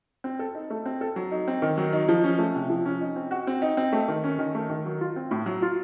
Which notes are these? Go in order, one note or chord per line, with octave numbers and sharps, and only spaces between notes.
C4
A4
D#4
A3
C4
A4
F#3
D#4
C4
D#3
F#3
D#4
F3
C#4
A3
C3
F3
C#4
D#4
C4
F#4
C4
D#4
C4
A3
D#3
C#4
D#3
A3
D#3
F#3
F4
C4
A2
F#3
F4